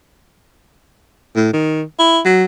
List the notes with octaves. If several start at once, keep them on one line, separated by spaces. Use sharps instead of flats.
A2
D#3
E4
F#3